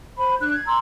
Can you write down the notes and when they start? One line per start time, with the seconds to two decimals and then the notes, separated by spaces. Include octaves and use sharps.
0.18 C5 B5
0.39 D4 F#6
0.53 G#6
0.66 A#5 C6 E6